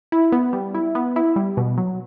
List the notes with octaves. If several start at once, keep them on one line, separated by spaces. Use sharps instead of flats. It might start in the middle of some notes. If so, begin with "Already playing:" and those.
E4
B3
G3
E4
B3
E4
G3
B2
F#3